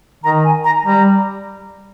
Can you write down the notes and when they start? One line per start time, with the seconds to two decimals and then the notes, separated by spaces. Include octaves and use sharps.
0.24 D#3 A#5
0.44 G#5
0.64 A#5
0.85 G3 A#5